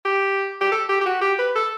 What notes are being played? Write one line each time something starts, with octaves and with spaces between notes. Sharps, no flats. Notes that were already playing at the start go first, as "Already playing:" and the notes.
G4
G4
A4
G4
G4
F#4
G4
B4
A4